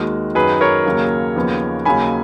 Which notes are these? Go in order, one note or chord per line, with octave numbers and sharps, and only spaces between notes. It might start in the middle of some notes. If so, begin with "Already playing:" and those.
Already playing: D#2 D#3 G#3 F#4 A#4
F#2 D#3 F#3 G#4 B4
A#4 C#5
D#2 C#3 F#3 A#3
D#2 C#3 F3 B3
D#2 C#3 F#3 A#3 G#5 B5